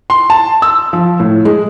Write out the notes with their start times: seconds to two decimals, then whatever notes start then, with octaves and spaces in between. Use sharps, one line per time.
0.10 C6
0.30 A5
0.62 E6
0.93 F3
1.20 A2
1.45 G#3